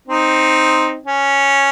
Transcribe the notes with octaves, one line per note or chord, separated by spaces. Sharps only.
C4 D#4
C#4